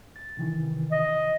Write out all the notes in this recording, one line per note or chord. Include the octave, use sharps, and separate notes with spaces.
A6
C3 D#3 E3
D#5